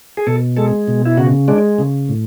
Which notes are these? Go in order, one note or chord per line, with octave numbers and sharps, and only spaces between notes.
G#4
B2 A4
G#3 A4
B2
E4
C#3 F#4
G#3 D4
C#3
A2